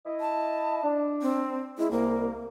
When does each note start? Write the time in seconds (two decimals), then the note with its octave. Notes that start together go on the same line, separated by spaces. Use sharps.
0.06 E4 D#5
0.20 A5
0.83 D4
1.22 C4
1.78 G#3 E4
1.91 C2 A#3